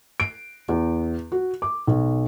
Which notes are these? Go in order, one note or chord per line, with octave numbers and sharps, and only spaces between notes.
D7
E2
F#4
D6
B1